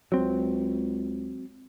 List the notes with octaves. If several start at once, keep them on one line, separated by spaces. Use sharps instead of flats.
C#2 F#3 C4